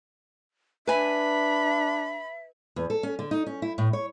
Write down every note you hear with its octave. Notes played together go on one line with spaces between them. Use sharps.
D4 B4 E5 G#5 B5
E2
A4
C#4
D3
D#4
C#4
E4
A2
C#5